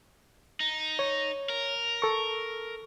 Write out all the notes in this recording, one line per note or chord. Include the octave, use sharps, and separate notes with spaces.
D#4
C#5
A#4
A4 C#6